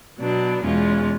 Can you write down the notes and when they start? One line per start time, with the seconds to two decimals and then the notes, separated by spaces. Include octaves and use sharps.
0.20 B2 F#3 B3 D4
0.63 E2 B2 G#3 C#4 F4